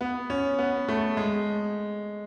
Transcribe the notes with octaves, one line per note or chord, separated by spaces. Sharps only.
B3
C#4
B3
A3
G#3